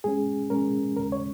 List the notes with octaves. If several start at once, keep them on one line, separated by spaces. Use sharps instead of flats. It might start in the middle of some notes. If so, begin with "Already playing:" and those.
G#2 G#3 C#4 G#4
G#2 G#3 C#4 A#4
D#2 C#3 G#3 C#4 A#4
C#5